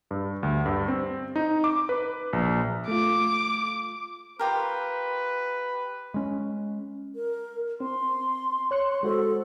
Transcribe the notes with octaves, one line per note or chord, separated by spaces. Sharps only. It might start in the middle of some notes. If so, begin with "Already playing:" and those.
G2
D2
G2
C4
D#4
D6
B4
A#1
A3 F4 D6
F4 G4 A#4 B4
G#3 C#4
A#4
C4 C6
C#5 F#6 C#7
G#3 F#4 A4 C5